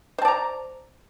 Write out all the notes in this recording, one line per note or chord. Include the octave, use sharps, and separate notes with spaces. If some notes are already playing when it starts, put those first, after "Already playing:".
C5 D5 A5 A#5